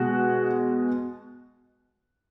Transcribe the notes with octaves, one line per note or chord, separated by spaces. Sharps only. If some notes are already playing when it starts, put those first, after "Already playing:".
Already playing: B2 G#3 F#4